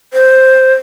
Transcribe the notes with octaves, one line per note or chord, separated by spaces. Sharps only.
C5